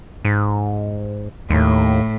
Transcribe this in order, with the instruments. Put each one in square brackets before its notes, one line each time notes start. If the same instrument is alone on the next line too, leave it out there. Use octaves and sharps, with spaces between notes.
[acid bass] G#2
[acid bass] D#2 [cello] A2